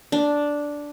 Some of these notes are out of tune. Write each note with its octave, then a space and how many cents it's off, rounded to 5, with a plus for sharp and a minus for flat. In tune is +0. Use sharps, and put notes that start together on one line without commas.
D4 -5